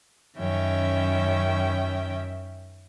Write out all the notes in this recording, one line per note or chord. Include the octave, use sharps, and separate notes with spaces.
F#2 D#3 C#4 E5 G5